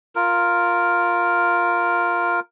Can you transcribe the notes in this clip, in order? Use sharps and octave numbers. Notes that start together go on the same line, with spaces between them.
F4 A#4